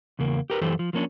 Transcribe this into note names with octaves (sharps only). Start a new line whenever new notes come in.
E2 C#3 A#3
G4 A#4 B4
F#2 E3 G4 A4 C5
F3
F3 A#3 C#4 D4